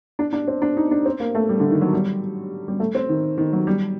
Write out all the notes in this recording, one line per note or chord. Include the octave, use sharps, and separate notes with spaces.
D4
D4
C4
D4
D#4
D4
C4
A#3
A3
G3
D3
D#3
F#3
G3
G3
A3
C4
D#3
D#3
F#3
G3